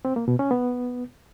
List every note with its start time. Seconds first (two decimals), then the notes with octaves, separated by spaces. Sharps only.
0.05 C4
0.16 A#3
0.28 B2
0.39 C#4
0.51 B3